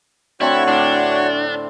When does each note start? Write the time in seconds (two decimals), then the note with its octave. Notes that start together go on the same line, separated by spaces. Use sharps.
0.41 D3 A3 C4 E4 F#4 C#5
0.68 A2 D4 D5